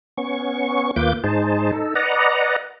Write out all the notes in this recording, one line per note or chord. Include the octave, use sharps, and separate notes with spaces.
B3 C#4 C#6
D#2 A#3 F4 B4 D6 G6
G#2 D#4 G#4 C5 A5
D#4 A4
B4 D5 D#5 F#5 A#5